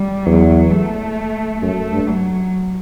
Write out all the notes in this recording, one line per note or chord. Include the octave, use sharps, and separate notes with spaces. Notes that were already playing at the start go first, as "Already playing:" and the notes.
Already playing: G3
E2 F#3
A3
F#2 A3
G2
F#3